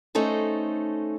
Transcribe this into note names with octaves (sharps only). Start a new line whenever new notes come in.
A3 C#4 D#4 A4 C5